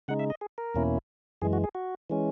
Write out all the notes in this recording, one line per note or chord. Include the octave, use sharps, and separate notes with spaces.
C#3 G#3 D#4 F#5
E5
D#5
G#4
A#4
E2 B2 A#3 C#4 E4
F#2 E3 G#3 G#4
F#4
G#4
F#4
E3 G#3 C#4